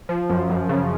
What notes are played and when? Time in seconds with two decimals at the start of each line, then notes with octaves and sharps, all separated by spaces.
0.09 F3
0.29 F#2
0.50 F#2
0.69 C#3